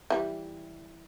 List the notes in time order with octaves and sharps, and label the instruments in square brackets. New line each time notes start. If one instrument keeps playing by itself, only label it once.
[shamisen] E3 G3